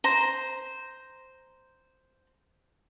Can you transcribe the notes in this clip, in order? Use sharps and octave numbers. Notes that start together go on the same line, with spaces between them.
C5 A#5